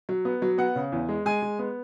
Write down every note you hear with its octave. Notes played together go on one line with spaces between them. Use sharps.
F#3
B3
F#3
B3 F#5
C#3
E2
G#3
G#3 G#5
G#3
B3